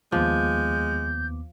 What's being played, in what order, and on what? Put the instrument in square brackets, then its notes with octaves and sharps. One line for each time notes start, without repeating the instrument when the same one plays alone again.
[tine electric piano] D#2 B3 D6 [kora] F3 [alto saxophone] G#3 [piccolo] G6